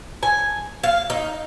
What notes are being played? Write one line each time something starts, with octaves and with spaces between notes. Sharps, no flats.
G#5
F5
D#4